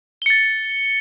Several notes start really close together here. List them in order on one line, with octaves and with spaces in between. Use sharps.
G7 C#7 A6